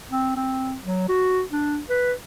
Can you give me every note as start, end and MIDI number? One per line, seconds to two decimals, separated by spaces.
0.11 0.32 60
0.36 0.76 60
0.85 1.05 54
1.09 1.42 66
1.53 1.80 62
1.89 2.13 71